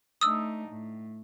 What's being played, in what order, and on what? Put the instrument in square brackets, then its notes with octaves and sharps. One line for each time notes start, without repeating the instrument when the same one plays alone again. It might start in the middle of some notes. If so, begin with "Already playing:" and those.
[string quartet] A3 D4 D#4 [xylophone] D#6 E6
[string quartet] A2